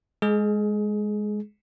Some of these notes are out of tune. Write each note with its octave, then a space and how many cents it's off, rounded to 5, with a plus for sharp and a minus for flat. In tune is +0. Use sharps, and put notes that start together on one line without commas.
G#3 +0 G#4 +25